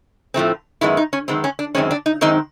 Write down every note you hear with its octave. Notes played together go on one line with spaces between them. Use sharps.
A2 F3 A3 C4
F#2 D#3 G#3 B3 E4
D#4
C#4
F#2 D#3 G#3 B3 C4
C#4
D4
F#2 D#3 G#3 C4 C#4
D4
D#4
F#2 D#3 G#3 C4 D#4